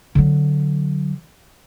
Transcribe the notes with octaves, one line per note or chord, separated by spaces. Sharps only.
D3 F#3